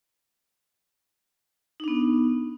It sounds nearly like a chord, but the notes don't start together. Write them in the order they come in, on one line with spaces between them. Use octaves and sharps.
D#4 D4 B3